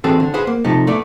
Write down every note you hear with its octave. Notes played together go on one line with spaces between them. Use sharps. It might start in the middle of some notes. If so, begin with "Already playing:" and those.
E3 C4 F#4 G#4 A4
D3
G#4 B4 C5 F#5
A#3
C3 F3 A3 D#4
A3 B3 E4 D5